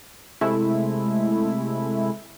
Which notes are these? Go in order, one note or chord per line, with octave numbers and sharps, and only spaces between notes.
C3 G#3 A3 E4